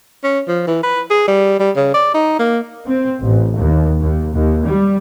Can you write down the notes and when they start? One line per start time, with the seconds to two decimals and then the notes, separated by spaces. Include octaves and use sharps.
0.24 C#4
0.48 F3
0.68 E3
0.83 B4
1.10 G#4
1.28 G3
1.60 G3
1.76 C#3
1.94 D5
2.14 D#4
2.39 A#3
2.85 C4
3.20 A1
3.57 D#2
3.99 D#2
4.34 D#2
4.66 G3